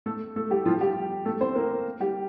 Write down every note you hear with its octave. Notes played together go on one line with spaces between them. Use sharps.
A3 A4
A3 A4
G3 G4
F3 F4
G3 G4
A3 A4
C4 C5
A#3 A#4
G3 G4